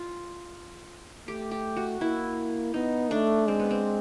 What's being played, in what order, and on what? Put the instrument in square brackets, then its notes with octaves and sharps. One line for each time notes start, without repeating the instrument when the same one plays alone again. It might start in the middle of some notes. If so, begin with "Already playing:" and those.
Already playing: [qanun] F4
[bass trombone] A3 [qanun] G4
[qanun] G4
F#4
[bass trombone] A#3 [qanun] E4
[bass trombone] B3 [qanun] D#4
[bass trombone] A3 [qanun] D4
[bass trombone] G#3 [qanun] C4
[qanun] B3
C4